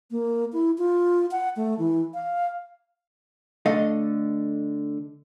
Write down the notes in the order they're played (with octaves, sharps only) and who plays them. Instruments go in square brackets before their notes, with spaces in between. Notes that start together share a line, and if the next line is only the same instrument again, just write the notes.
[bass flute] A#3
E4
F4
F#5
A3
E3
F5
[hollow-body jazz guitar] D3 A3 A4 D#5 F5